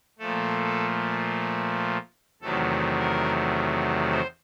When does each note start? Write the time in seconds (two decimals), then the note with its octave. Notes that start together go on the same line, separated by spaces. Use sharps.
0.18 A#2 F3 A3 A4
2.42 E2 C3 D#3 F#3 A3 A4
2.99 A#4
4.10 C5